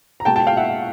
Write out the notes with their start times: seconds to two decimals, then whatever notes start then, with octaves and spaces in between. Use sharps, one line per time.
0.20 A#5
0.25 B2 G#3 G5 A5
0.36 G5 A5
0.47 F5 G5
0.57 E5 F#5